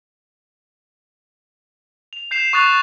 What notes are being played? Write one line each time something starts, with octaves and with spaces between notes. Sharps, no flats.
F7
G6 C7 E7 F7
C#6 D#6 F#6 A6 E7 F7